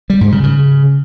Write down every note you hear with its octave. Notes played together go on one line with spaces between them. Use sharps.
G3
G#2
C#3
C#3